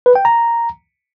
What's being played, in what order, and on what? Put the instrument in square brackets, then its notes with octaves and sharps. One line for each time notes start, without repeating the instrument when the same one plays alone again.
[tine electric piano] B4
G5
A#5